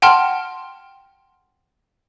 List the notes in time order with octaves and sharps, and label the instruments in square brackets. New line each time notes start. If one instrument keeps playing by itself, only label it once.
[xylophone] F#5 G5 A5 C6 F6